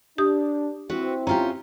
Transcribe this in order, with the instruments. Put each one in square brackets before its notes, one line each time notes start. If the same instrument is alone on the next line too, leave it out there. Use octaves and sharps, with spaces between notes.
[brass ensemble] D4 [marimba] G4 D#6
[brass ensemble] C4 E4 [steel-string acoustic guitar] F#4 B4 E5
[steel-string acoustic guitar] C#4 F4 G4 [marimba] A#5